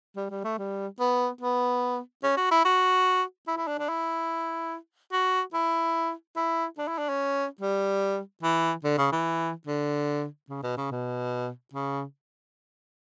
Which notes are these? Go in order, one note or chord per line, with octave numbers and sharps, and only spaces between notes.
G3
G3
A3
G3
B3
B3
C#4
F#4
E4
F#4
E4
E4
D4
D4
E4
F#4
E4
E4
D4
E4
D4
C#4
G3
E3
D3
C#3
E3
D3
C#3
B2
C#3
B2
C#3